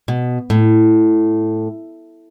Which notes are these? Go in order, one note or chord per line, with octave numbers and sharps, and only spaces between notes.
B2
A2